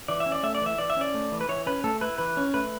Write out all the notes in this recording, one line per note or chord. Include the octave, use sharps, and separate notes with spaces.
E3 D5
E5
C#4
D5
A3 E5
D5
E3
E5
E3 D5
E5
C#4 D5
A3
E3
B4
E3 C#5
C#4 B4
A3 A4
E4 B4
E3 B4
C#4
A3 B4